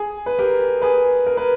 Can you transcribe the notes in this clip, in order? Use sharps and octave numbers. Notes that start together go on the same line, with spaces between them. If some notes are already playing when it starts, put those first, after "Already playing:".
Already playing: G#4
B4
G4 A#4
G#4 B4
A#4
B4